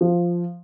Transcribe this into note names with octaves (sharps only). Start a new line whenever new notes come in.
F3